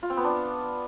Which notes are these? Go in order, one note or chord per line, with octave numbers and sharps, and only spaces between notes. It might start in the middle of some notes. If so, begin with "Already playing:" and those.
F4
C4
B3
D4